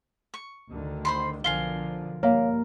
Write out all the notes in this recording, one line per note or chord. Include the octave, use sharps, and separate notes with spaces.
C#6
D2 D3 D#3
C5 B5 C6
B1 D3 F3 F4 A#4 G#5 C7 G7
G2 A#3 C#5 F5